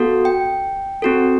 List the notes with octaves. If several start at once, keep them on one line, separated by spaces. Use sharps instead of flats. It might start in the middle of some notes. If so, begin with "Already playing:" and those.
Already playing: B3 F#4 A4
G5
C4 F#4 A4